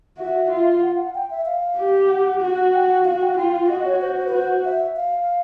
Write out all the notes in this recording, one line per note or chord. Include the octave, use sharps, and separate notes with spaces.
F#4 E5
F4
F#5
F5
F#5
G5
E5
F5
G4
F#5
F#4
G5
F#5
F#4 F5
G5
F4 G5
F#4 D#5
C#5
C5
C5
B4
F#4 C5
E5
F5